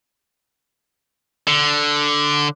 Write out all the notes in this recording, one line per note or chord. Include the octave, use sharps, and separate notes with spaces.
D3